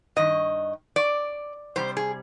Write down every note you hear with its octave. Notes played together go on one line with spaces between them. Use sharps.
G2 D#3 D#5
D5
C3 D#3 G3 C5
G#4